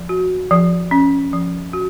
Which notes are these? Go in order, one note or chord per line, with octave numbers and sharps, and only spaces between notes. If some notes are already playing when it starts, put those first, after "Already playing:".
Already playing: F3
F#4
F3
C#4
F3
F#4